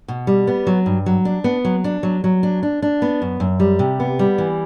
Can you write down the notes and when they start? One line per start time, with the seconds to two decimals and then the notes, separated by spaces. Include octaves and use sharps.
0.08 B2
0.27 G3
0.47 B3
0.67 F#3
0.86 G2
1.06 F#3
1.25 D4
1.44 B3
1.65 F#3
1.84 D4
2.03 F#3
2.24 F#3
2.43 D4
2.63 D4
2.82 D4
3.02 B3
3.22 F#2
3.40 F#2
3.60 G3
3.79 C3
4.00 B3
4.19 G3
4.38 E3